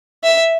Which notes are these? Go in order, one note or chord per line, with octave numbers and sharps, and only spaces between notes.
E5